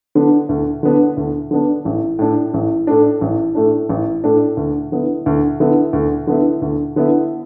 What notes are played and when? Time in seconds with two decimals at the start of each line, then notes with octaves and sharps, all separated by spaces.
0.15 D3 B3 D4
0.49 D2
0.83 D3 B3 D4
1.17 D2
1.51 D3 B3 D4
1.85 A1
2.19 A2 A3 D4
2.54 A1
2.87 A2 A3 D4
3.21 A1
3.55 A2 A3 D4
3.89 A1
4.24 A2 A3 D4
4.57 D2
4.92 D3 B3 E4
5.26 D2
5.60 D3 B3 E4
5.93 D2
6.27 D3 B3 E4
6.62 D2
6.96 D3 B3 E4